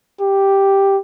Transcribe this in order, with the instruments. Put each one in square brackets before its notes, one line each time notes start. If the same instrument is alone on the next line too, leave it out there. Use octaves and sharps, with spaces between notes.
[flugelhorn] G4